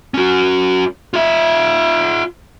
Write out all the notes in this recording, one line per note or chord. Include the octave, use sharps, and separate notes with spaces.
C#4 F#4
F4 E5